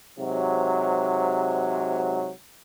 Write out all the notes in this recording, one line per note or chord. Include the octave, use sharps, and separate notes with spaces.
G#2 C3 F#3